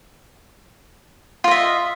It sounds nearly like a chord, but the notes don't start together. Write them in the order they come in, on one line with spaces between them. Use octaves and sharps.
F4 D#5 E5